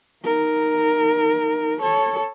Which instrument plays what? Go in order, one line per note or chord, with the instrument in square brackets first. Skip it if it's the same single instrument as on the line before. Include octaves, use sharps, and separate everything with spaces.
[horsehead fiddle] D#4 A#4
A4 C#5